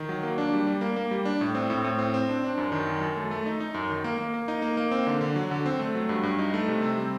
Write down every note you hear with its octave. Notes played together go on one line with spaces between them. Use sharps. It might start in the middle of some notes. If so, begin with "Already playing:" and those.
Already playing: D#3
F#3
A#3
D4
G3
G3
A#3
A#3
G3
D4
A2
C4
A2
A2
C4
C4
D4
D4
F#2
D#3
F#2
F#2
A3
A3
D#4
D#4
F#2
D#3
A#3
A#3
A#3
D#4
A#3
A#3
C4
D3
D3
F#3
D3
C4
A3
F#3
G2
G2
D#4
A3
C3
C4
G3